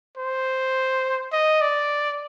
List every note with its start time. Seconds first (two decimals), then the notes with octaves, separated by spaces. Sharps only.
0.17 C5
1.32 D#5
1.61 D5